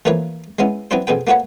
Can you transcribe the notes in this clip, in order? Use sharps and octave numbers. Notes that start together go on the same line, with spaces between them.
E3 F3 A3 A#3 B4 C#5
G#3 B3 C#4 E4
F#3 B3 C4 D4 E4 C5
F2 B2 G#4 B4 G5
A3 A#3 F#4 B4 C#5 F#5